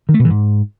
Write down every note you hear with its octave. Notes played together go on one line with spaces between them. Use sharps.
D#3
A3
B2
E3
G#2